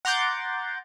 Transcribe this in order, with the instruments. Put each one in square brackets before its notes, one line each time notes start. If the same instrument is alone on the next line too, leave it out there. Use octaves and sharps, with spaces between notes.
[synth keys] F#5 A#5 C6 D6 G6 A6